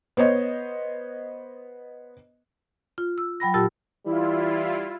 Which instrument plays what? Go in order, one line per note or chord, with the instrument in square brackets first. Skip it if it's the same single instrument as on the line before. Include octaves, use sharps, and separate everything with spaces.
[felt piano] B3 C5 C#5 D#5
[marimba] F4
E6
F#3 G5 B5 A#6
A#2 F4 G4 A5 E6 A6
[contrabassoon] E3 [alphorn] G3 [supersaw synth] E4 F4